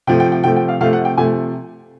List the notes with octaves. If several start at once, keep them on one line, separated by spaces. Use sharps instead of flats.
C3 F3 A3 G5
G5
G5
C3 F3 A3 G5
G5
F5
C3 F3 A3 F5
F#5
G5
C3 F3 A3 G#5